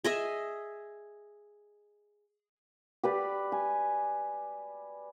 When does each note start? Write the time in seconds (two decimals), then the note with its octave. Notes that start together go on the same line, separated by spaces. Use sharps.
0.04 G#4 D#5 E5
3.04 G4 B4 D5
3.52 G#5